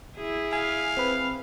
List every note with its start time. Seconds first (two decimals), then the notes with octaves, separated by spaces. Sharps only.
0.17 E4 G#4
0.53 F5 G#5
0.97 C4 B4